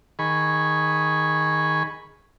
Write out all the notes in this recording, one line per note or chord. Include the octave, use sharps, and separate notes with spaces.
D#3 G#4 B5 C#6